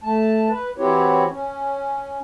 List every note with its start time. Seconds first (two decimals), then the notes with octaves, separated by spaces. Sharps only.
0.03 A3 A5
0.49 B4
0.78 E3 C4 E4 F#4 G4 C#5
1.31 C#4